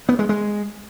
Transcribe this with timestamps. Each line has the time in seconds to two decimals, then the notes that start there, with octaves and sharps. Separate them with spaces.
0.09 B3
0.19 G#3
0.29 G#3